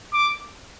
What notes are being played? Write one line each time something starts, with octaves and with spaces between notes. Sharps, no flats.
D6